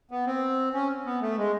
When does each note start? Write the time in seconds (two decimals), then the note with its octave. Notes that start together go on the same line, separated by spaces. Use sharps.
0.11 B3
0.26 C4
0.74 C#4
1.06 B3
1.22 A3
1.38 G#3